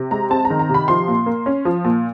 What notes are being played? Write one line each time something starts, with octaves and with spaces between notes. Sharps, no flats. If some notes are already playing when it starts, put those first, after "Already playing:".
Already playing: C3
G#3 A#5
C4 A5
A#5
D#3
A#5
C3
B5
F3 C6
A#2
A#3
C#4
F3
A#2